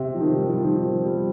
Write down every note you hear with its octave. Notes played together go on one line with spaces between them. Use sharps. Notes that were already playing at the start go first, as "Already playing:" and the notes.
Already playing: C3
F3
D#3
G3
F3
D#3
F3
G3